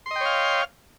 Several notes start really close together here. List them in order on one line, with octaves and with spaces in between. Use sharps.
C6 D#5 G5 C#5 F5